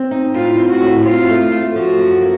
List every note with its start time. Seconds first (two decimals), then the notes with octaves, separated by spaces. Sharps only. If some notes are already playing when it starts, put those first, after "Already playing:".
Already playing: C4
0.11 D#4
0.34 A2 F4
0.58 C4
0.69 F#4
0.81 A2
1.05 C4 F4
1.29 A3
1.52 A3
1.75 F3 F#4
1.99 F#2
2.22 A#3